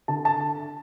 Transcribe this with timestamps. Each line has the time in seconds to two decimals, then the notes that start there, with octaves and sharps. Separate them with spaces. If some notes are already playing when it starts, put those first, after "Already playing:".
0.08 D3 A5
0.25 A5